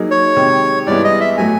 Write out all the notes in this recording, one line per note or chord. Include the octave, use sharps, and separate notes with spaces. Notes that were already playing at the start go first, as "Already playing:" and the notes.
Already playing: F#3 A#3 D#4 G#4
C#5
C3 D#3 G#3
G2 E3 G#3 B3 E4 D5
D#5
E5
A2 F#3 A3 G#5